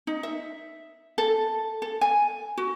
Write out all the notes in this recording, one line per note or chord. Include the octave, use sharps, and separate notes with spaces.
D#4
E5
A4
A4
G#5
F#4